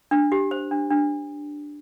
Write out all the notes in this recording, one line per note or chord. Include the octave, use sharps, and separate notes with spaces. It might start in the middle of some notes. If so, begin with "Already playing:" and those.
D4
G4
C5
D4
D4